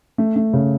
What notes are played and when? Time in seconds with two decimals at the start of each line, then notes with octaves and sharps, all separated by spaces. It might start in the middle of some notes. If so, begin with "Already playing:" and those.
0.18 A3
0.36 A3
0.53 C#3